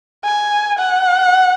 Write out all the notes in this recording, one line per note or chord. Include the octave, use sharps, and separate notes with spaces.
G#5
F#5